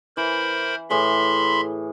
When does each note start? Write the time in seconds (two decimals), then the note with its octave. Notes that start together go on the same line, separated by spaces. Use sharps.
0.17 E3 A#4 C5 B5
0.90 A2 E3 G#4 E5 B5 C6